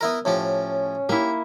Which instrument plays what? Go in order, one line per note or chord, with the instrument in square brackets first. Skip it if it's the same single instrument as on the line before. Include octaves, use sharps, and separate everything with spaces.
[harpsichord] B3 E4 A#4
[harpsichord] A2 F3 G4 [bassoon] C#4
[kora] A#3 E4 [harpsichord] G4